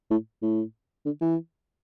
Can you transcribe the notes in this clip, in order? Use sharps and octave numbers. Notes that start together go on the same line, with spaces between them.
A2
A2
D3
E3